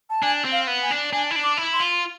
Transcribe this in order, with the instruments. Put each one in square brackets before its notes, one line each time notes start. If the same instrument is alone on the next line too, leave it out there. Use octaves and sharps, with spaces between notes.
[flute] A5
[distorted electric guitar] D4 [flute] G#5
[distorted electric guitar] C4
[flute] F5
[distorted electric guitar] B3
[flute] G#5
[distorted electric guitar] D4
[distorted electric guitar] D4 [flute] G#5
[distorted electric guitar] E4
D4
[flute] D6
[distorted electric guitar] E4
[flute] C6
[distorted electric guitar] F4